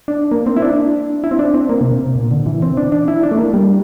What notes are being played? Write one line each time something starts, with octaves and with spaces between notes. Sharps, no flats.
D4
A#3
C4
E4
D4
E4
C4
D4
C4
A#3
C3
C3
A#2
D3
E3
C4
D4
D4
E4
D4
A3
A#3
G3